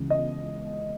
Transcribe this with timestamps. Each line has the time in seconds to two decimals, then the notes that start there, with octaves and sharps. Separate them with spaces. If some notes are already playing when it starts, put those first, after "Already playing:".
Already playing: C#2 C#3 E3
0.10 D#5